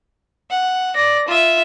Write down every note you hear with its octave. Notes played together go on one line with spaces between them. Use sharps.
F#5
D5 A#6
F4 E5